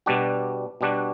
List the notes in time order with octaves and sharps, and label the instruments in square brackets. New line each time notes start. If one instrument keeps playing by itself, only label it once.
[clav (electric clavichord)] B2 G3 D4 F#4
B2 G3 D4 F#4